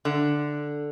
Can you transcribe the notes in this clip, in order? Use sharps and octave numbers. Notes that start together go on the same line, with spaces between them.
D3